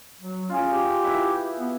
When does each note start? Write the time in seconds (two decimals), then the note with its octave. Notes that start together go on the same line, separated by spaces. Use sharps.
0.20 F#3
0.50 C#4 F4 G#4
0.69 G4
1.04 E4 B4 E5
1.57 B3